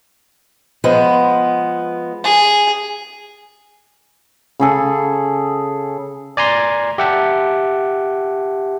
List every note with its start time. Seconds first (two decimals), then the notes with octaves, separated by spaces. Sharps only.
0.84 F3 G#3 B3
2.24 G#4
4.60 C#3 G#4 A4
6.37 D5 G#5 A#5 C6
6.98 G4 E5 F#5 G5 A5